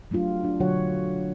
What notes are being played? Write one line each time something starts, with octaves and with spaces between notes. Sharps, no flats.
F#3 A3 D4 F4 G4
D4
B2 D3 F#3 F#4 C#5 F#5